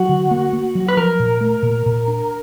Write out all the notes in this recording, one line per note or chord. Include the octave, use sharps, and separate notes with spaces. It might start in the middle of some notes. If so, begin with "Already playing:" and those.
Already playing: F#3 F#4
D3
A#3
A#3
F#3
B4
F3 A#4
A#2
A3
A#2
A#2
D4